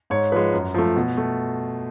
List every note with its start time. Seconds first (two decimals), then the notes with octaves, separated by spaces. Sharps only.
0.10 G#2 C#5
0.32 F3 G#3 B4
0.53 F#2
0.74 F3 A3
0.96 B2
1.17 A3